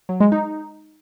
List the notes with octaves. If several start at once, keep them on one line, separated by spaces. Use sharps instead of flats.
F#3
G#3
D#4